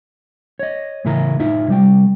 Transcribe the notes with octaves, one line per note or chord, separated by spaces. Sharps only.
C#5 D#5
A2 C#3 E3 E4 A#4 A#5
A2 D#4 F4 E5
C3 G3 G5